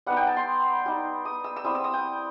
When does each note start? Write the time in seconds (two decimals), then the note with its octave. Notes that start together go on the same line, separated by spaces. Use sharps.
0.06 G3 B3 D#4 F#5
0.17 G5
0.27 A5
0.37 C6
0.86 G3 D#4
1.25 D#6
1.44 E6
1.56 E6
1.64 G3 C4 E4 D#6
1.75 E6
1.84 D#6
1.94 G5